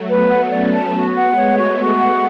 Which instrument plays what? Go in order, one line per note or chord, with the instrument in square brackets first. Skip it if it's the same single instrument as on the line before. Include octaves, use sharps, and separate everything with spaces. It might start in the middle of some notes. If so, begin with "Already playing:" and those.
Already playing: [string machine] F#3 A3
[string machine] B3 [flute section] B4
[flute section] F#5
[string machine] C#4 [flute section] D5
[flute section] A5
[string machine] B3 [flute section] F#4
[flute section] F#5
[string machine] G#3
[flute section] C#5
[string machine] A3
[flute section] F#4
[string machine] G#3 [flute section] F#4
[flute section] F#5